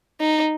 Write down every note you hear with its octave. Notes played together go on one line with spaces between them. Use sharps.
D#4